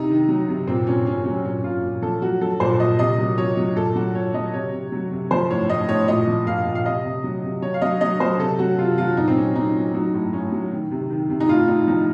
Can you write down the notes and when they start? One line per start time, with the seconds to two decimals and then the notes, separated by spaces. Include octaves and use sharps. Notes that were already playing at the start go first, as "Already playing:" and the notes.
Already playing: C3 D#4
0.10 D#3
0.28 F#3
0.48 C3
0.67 A#2 C4
0.87 A#2 C#4
1.06 A#2 C#4
1.25 F#3 C#4
1.45 A#2 C#4
1.64 A#2 F4
1.83 A#2
2.02 F3 A4
2.22 F#3 F#4
2.41 F#3 A4
2.60 A#2 C5
2.80 A#2 D#5
2.99 C3 D#5
3.18 F#3
3.38 F#3 C#5
3.57 F#3
3.76 A#2 A4
3.95 F#3 F#4
4.15 A#2 C#5
4.34 F#3 D#5
4.54 C3 C#5
4.72 C3
4.92 F#3
5.11 C3
5.31 F3 C5
5.50 A2 C#5
5.70 A2 D#5
5.89 A2 C#5
6.08 A#2 D#5
6.27 F3
6.46 A#2 F5
6.66 A#2
6.75 F5
6.86 C3 D#5
7.05 C3
7.24 F#3
7.44 C3
7.62 F#3 C#5
7.74 F5
7.82 F#3 D#5
8.01 F#3 D#5
8.20 F#3 C5
8.39 C3 A4
8.59 F#3 F#4
8.78 C3 F4
8.98 F#3 F4
9.17 A#2 D#4
9.28 C4
9.36 F#3 C#4
9.56 F#3 D#4
9.75 F#3 C#4
9.94 F#3 D#4
10.14 A2
10.33 A2 C#4
10.52 F#3
10.71 D#3
10.91 C3
11.10 D#3
11.29 C3
11.40 D#4
11.48 A2 F4
11.68 A2 D#4
11.87 F3 D#4